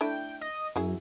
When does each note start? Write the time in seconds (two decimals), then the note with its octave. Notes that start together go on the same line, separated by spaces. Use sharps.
0.01 A3 D4 E4 G5
0.41 D#5
0.76 F#2 F#3 E4 G#4